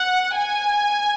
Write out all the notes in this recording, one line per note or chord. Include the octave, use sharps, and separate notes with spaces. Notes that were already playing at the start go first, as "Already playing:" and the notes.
Already playing: F#5
G#5